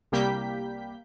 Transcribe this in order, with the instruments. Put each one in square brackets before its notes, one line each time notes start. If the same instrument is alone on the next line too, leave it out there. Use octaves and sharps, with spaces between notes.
[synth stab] C2 G3 A#3 G4 G6 B6